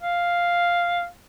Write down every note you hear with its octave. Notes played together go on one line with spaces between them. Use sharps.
F5